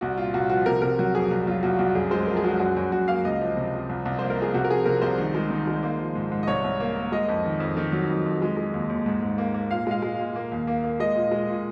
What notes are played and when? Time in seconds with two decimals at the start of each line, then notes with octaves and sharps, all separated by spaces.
0.01 C2 F#4
0.18 A#2 F4
0.34 C2 F#4
0.49 F3 F#4
0.66 C3 A#4
0.82 C3 A#4
0.99 F#3 F#4
1.15 F2 G#4
1.31 C2
1.47 F#3 F4
1.63 C2 F#4
1.79 C2 F#4
1.95 F#2 G#4
2.11 G#3 C5
2.27 F3 A#4
2.37 G#4
2.44 G#3 F#4
2.59 F#2 F#4
2.76 F#2 F#4
2.92 F#2 F#4
3.08 A#3 F5
3.25 C#2 D#5
3.41 F3
3.57 C3
3.74 F3
3.89 C2
4.05 C2
4.19 A#3 C5
4.30 A#4
4.37 F3 G#4
4.54 C3 F#4
4.64 A#4
4.69 F3 G#4
4.85 C3 A#4
5.02 C2 C5
5.18 D#3
5.35 G#3
5.50 D#3
5.67 G#3
5.83 A#3
5.99 F3
6.15 G#2
6.32 G#2
6.43 D#5
6.47 C2 C#5
6.64 C2
6.80 A#3
6.95 A#3
7.12 G#3 D#5
7.28 F2
7.45 D#3
7.60 F2
7.77 D#3
7.92 F#3
8.09 F2
8.26 F2
8.42 G#3
8.57 G#3
8.74 D#2
8.90 D#2
9.06 G#2
9.22 G#2
9.38 A#3
9.54 A#3
9.71 A#2 F5
9.87 G#3 F5
10.02 G#3
10.19 A#2
10.36 A#3
10.52 D#2
10.67 A#3
10.84 A#3
11.00 G#3 D#5
11.16 A#2
11.32 G#3
11.48 A#2